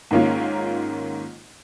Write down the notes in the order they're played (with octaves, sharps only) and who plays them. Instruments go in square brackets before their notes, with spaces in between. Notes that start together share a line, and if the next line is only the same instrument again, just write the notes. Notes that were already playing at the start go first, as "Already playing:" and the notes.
[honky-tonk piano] G#2 D#3 A#3 C#4 F4